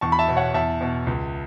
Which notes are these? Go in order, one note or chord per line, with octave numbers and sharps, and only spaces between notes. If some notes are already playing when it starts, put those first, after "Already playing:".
E2 A5 C#6
B5
E5 A5
B2
C#5 F#5
E2 E5 A5
B2
C#2